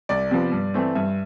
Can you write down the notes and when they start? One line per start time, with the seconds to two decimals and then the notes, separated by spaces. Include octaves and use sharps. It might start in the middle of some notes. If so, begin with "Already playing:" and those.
0.09 C2 D5
0.31 C3 F3 B3
0.52 G2
0.74 E3 A3 C4
0.95 G2 E5